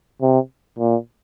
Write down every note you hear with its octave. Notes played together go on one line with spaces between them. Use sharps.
C3
A#2